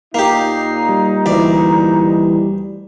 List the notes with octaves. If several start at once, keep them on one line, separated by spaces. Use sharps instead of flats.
A#2 A#3 D#4 G4 C7
G3
D2 E3 D5